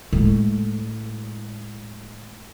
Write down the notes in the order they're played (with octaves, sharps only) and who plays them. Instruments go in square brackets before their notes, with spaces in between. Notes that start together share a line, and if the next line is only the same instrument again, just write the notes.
[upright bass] A2 G#3